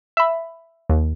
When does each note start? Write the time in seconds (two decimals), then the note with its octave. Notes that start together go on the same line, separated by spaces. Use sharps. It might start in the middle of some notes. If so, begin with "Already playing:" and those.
0.17 E5 B5
0.90 D#2